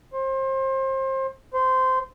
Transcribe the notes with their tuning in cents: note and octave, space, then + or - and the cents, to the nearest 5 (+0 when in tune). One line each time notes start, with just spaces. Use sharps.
C5 +30
C5 -15